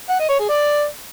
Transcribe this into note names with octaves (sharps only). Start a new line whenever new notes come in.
F#5
D#5
C#5
G#4
D5